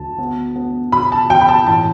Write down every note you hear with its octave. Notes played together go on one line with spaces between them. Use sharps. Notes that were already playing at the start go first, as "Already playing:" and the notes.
Already playing: D2 A5
B3
B3
B2 B5
A5
B2 G5
B5
A5
A1 A5